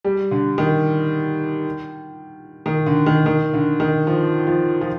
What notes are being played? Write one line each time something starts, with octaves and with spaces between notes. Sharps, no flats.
G3
D3
D#3
D#3
D3
D#3
D#3
D3
D#3
F3
F3
F3